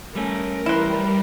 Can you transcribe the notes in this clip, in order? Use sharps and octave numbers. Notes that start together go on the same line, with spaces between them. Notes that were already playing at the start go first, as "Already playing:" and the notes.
G3 A3 C#4 A#4
E3 G3 E4 B4 C5